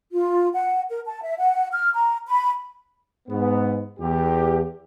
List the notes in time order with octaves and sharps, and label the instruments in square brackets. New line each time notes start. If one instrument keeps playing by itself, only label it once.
[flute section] F4
F#5
A#4
A5
E5
F#5
F6
A#5
B5
[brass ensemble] G#2 B3
E2 G4